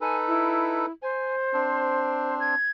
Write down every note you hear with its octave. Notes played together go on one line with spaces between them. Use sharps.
D#4 A4 B4 G#5
E4
C5 G#5
C4 D4
G#6